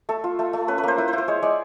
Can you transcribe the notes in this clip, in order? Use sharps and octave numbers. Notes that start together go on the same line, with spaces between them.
A3 A4
F4
A3
A3
C#4 B4
B4
A#3 C5
E4 B4
C5
E4
C5
G#3 C#5
G#3 D5